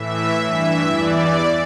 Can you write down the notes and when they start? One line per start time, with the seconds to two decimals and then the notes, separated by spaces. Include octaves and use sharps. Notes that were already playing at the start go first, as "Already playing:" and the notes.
Already playing: A2 E3 E5
0.40 G2 E3 E5
0.91 E2 E3 D5